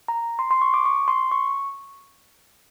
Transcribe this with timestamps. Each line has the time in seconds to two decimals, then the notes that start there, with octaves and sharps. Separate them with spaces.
0.08 A#5
0.39 C6
0.51 C6
0.62 C#6
0.74 D6
0.85 C#6
1.08 C6
1.32 C#6